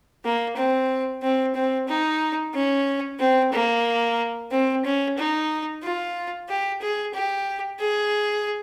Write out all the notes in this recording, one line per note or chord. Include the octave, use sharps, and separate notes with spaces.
A#3
C4
C4
C4
D#4
C#4
C4
A#3
C4
C#4
D#4
F4
G4
G#4
G4
G#4